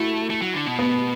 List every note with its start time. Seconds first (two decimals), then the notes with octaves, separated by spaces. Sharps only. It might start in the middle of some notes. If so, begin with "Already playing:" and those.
Already playing: A3 E4 F#4
0.30 A3
0.42 F#3
0.54 D3
0.66 B2
0.79 B3